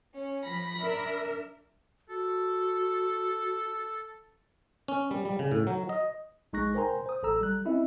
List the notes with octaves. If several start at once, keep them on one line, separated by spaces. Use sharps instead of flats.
C#4
F3 B5 A#6
D4 A#4 E5
F#4 A4
C#4
G3
G3
C#3
A2
F#3
D#5
A#1 G#3 D#4 C#6 F#6 A#6
A#4 C5 G5 G#5 A#5 C6
C5 D#6
A1 A4 A#5 E6
G3 F#6
C4 C#4 E4 D#5 E5